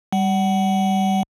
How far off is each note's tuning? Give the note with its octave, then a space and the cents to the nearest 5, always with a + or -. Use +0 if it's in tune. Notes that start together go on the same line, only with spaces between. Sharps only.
G3 +0 F#5 +30